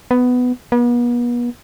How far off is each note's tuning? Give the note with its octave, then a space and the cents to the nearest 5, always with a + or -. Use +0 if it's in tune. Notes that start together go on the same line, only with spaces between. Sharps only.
B3 +10
B3 -40